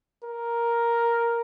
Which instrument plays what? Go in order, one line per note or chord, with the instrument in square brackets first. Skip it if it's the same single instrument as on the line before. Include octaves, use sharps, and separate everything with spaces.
[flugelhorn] A#4